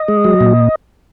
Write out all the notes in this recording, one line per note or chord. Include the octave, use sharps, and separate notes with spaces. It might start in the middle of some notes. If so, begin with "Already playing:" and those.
Already playing: D#5
G#3
F#3
A#2